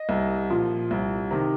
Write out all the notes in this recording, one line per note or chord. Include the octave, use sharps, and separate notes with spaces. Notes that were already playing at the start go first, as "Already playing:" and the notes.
Already playing: D#5
C2
A#2 F3
C2
C3 D#3